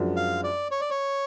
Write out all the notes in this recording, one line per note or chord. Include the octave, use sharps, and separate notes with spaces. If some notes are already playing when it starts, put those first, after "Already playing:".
Already playing: F#2 F3 G#3 D4 F#4
F5
D5
C#5
D5
C#5